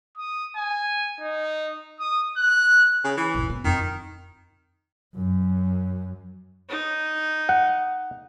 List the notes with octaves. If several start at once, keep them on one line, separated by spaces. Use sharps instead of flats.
D#6
G#5
D#4
D#6
F#6
C#3
E3
D#1 G#1
B3
F2 D#3
F#2
D#4
F#5